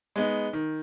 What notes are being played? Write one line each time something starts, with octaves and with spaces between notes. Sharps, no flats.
G#3 B3 D#4
D#3